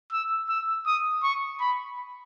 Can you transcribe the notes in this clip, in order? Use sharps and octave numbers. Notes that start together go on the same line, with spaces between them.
E6
E6
D#6
C#6
B5